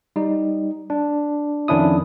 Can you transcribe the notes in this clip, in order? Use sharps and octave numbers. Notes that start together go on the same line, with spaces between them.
G3 D#4
D4
F2 D#3 C#4 D4 E4 D#6